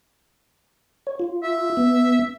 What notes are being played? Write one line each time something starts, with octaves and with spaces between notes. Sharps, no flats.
C#5
F4
E5
B3